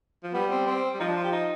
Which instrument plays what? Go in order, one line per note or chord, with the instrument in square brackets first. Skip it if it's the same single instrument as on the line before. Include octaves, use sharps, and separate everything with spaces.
[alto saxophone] F3
[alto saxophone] G3 [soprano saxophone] B3
[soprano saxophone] C4
C4
[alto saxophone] G3
[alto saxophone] F3 [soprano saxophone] D#4
[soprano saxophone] D4
F4
G4
D#4